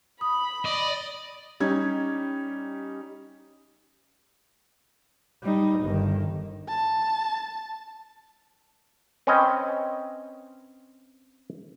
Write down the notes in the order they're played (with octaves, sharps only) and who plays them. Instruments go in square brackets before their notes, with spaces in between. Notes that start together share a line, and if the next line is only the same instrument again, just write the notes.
[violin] B5 [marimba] D#6
[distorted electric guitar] D5 [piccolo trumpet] D#5
[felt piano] G3 C#4 D#4 G#6
[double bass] G3 D#4
G1 D#3
[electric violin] A5
[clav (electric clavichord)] C4 C#4 B4 C#5 D#5 G5